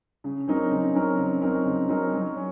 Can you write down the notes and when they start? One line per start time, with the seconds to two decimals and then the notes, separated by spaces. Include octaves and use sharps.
0.24 C#3
0.48 F#3 C4 D#4 A#4
0.71 C#3
0.95 F#3 C4 D#4 A#4
1.18 C#3
1.41 F#3 C4 D#4 A#4
1.65 C#3
1.89 F#3 C4 D#4 A#4
2.12 F#3
2.36 C#4